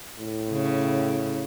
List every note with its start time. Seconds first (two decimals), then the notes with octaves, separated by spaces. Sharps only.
0.18 A2
0.51 C#3